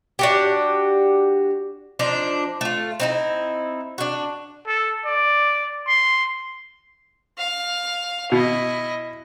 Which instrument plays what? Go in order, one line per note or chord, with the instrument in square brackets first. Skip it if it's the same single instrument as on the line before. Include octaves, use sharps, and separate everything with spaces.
[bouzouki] D4 F#4 G4
F3 D4 D#4 C5
A3 F4
C4 D#4 E4
D4 F#4
[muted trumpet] A4
D5
C6
[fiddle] F5
[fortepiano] B2 [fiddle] E4 D#5